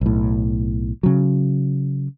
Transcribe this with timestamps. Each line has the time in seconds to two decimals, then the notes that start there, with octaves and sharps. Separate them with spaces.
0.01 B1 A2
1.03 C#3 F#3